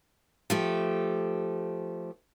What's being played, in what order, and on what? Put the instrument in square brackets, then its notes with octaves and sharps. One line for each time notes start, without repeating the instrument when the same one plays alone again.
[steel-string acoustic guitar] F3 A3 G4